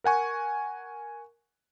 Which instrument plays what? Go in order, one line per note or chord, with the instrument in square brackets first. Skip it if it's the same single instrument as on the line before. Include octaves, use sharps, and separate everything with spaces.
[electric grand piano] A#4 F#5 G#5 C#6